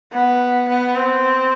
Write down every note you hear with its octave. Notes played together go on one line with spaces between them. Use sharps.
B3
B3
C4